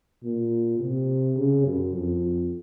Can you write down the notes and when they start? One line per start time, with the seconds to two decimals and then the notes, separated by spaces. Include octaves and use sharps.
0.24 A#2
0.80 C3
1.36 C#3
1.65 F#2
1.94 F2